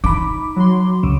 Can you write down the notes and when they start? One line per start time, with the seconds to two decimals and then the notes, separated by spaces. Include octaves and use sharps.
0.04 D#4 B5 D6
0.56 F#3 C6
1.03 C#2 C#3